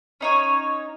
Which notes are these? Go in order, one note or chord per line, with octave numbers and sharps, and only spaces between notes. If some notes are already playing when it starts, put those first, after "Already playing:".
C#4 D#4 C#5